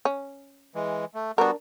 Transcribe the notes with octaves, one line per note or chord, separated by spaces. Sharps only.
C#4
E3 G#3
A3
G3 B3 D4 F#4 A#4